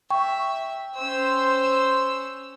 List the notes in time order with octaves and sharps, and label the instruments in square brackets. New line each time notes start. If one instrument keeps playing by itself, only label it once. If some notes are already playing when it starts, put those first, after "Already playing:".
[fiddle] E5 [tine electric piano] G5 [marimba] C#6
[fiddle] C#4 E6 [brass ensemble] C5